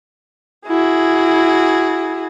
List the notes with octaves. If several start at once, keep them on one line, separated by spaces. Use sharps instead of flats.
E4 F#4 G#4